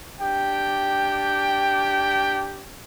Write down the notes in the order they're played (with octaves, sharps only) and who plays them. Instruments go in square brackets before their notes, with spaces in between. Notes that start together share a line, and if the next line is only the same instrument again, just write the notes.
[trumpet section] D4 G4 G5